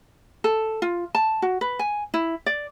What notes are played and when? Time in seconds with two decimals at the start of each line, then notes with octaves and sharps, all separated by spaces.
0.44 A4
0.82 F4
1.15 A5
1.42 F#4
1.61 B4
1.79 G#5
2.14 E4
2.46 D5